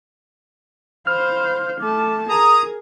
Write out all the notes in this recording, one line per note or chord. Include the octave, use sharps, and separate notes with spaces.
C5 F5 B5 F6
A3 A5 D6
G#4 A#4 A#5 D#6